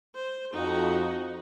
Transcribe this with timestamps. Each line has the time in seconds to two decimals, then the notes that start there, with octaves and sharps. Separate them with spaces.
0.15 C5
0.53 F2 D#4 F#4